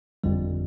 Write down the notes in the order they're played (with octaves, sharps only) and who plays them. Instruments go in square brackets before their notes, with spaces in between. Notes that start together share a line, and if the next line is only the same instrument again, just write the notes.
[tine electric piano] G1 F2 D3 G3